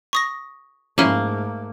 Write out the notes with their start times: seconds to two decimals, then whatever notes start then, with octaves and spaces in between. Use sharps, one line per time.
0.13 C#6 D#6 A#6
0.98 G#2 F3 A3 A#3 C#4 E4 F5 F6